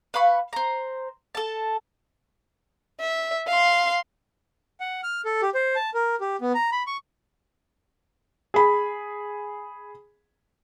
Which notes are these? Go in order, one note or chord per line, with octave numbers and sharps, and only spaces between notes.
B4 F5 B5 C#6
C5 A#5
A4 A5
E5
F5 C6
F#5
F6
A4
G4
C5
A5
A#4
G4
B3
A#5
B5
C#6
G#4 B5